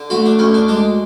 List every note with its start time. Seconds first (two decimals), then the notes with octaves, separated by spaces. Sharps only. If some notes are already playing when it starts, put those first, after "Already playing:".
Already playing: D3
0.10 A3 F#4
0.26 D4
0.39 D2 C#4
0.54 D4
0.68 G#3 D4